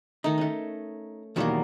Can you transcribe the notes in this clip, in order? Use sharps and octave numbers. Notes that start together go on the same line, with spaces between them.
D#3 A3 D#4
A3 C#4
E2 B2 D#3 F#3 G3 A#3